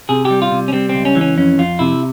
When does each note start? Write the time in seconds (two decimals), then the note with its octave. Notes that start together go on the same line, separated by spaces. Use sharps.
0.09 C3 G#4
0.25 G4
0.30 G3
0.42 F4
0.52 C3
0.68 C#4
0.73 G3 C4
0.89 C4
0.95 C#2
1.05 C#4
1.15 E3
1.21 C#4
1.37 F2 C#4
1.58 F2 F4
1.79 C3 E4